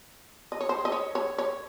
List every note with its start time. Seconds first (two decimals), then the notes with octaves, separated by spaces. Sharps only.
0.52 D#5
0.61 C#5
0.69 C5
0.85 D#5
0.92 C#5
1.15 C#5
1.38 C#5